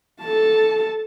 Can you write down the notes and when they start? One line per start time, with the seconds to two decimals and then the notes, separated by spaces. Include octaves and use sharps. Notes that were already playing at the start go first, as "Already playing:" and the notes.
0.22 A4 A5